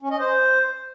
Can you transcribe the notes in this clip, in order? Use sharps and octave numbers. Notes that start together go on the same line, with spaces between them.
C#4
D#5
C5